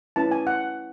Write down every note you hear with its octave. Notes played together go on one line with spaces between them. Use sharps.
C#4 E4 B4 A5
G#5
F#5